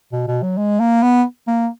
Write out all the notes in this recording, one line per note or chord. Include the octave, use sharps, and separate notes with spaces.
B2
B2
F#3
G#3
A#3
B3
A#3